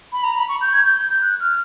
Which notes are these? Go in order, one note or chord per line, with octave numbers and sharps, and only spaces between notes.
B5
A#5
B5
C#6
G6
G#6
G6
F#6
F6